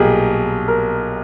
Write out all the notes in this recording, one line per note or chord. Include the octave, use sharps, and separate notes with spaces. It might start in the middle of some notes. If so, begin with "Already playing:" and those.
Already playing: B1 A#2 G3 G4 G#4 A#4
A#4